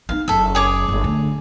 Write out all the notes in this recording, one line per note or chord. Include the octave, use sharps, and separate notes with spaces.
B3 D#4 F5
F#1 A4 E5
G#4 C#5 D6
G1
D2 D3